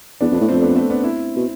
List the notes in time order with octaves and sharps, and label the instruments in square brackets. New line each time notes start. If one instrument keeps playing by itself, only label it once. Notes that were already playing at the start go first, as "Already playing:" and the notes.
[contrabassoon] E2 [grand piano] B3 D4
[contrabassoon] F2 [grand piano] B3 D4
[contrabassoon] A2
[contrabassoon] F2 [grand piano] A3 C4
[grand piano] B3 D4
A3 C4
B3 D4
C4 E4
[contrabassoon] B2